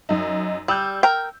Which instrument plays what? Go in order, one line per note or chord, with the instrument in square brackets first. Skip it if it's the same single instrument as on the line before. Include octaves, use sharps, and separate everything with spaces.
[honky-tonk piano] F#2 D#4
[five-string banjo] G3 [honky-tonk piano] E6 G6
[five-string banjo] A#4 G5